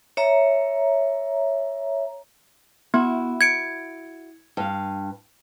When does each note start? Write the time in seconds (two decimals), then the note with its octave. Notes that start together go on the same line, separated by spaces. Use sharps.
0.17 C#5 E5 A#5
2.94 B3 E4 F#4
3.41 G#6 C#7 D7
4.57 G2 F5